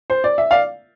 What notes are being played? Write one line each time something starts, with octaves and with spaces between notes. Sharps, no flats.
C5
D5
E5
D5 F5